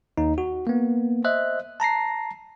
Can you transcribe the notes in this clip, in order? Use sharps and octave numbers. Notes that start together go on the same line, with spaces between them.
D#2 D#4
F#4
A#3 B3
C5 D#5 E5 F#6
A5 A#5 A#6 C7